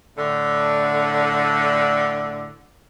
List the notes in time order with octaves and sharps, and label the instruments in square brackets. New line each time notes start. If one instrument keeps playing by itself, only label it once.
[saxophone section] A2 D3